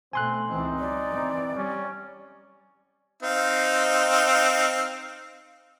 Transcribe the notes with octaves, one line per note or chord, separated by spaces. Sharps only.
B2 A3 C4 G#5 C6 F#6
C#2 E3 C4 D#4
F#3 D5
E3 C4
G3 C#4
C4 D#4 F5